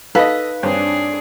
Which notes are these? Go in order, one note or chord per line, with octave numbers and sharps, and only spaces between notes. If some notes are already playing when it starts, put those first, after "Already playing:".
D#4 A4 B4 D#5 F5
G2 C4 D4 G#4 C#5